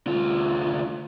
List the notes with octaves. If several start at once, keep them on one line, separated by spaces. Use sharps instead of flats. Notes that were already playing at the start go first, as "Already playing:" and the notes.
D2 F4